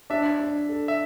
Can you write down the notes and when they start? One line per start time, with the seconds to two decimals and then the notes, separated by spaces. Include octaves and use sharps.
0.10 D4 E5
0.40 D4
0.69 A4
0.88 E5